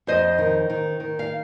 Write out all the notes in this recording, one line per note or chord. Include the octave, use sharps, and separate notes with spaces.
F2 C5 D#5
D#3
D#3
D#3
F5